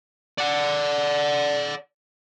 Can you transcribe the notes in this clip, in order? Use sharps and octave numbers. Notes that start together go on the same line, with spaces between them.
D5 F#5